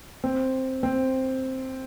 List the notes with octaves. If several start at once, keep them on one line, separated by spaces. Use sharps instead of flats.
C4
C4